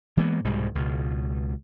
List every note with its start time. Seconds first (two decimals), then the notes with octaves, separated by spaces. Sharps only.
0.17 E3 G#3 A#3 B3
0.45 C2 G#2 B2 G3
0.75 C#2 B2